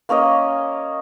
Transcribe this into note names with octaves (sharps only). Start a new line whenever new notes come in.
A#3 C#4 A#4 D#5